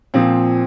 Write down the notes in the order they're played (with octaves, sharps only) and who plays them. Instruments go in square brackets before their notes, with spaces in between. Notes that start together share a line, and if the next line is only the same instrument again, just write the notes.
[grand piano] A#2 F3 C4